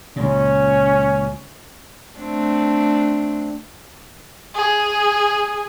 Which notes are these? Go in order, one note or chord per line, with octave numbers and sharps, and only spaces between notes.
C#2 A#2 C#4
A3 C4 D4
G#4